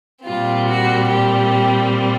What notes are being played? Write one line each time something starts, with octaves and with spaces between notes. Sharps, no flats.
A#2 G3 C4 F4
F#4
G4